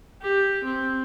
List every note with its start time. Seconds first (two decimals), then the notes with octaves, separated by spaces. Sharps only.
0.22 G4
0.64 C4